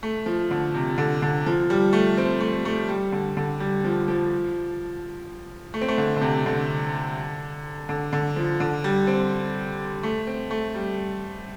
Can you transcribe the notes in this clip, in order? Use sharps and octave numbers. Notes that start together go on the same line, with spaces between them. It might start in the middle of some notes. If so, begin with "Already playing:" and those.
A3
F3
D3
C3
D3
D3
F3
G3
A3
C4
A3
A3
G3
D3
D3
G3
F3
F3
A3
C4
A3
D3
D3
C3
D3
D3
D3
F3
D3
G3
C4
A3
C4
A3
G3